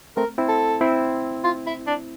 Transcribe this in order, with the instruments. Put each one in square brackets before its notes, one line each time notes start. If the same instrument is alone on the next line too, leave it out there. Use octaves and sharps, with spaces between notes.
[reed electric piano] A3 C4 [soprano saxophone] A#4
[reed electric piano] C4 E4
[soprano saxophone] A4
[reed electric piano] C4 E4
[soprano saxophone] F4
E4
D4